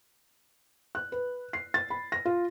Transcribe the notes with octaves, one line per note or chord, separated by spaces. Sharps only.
F#6
B4
C7
A6
B5
A#6
F4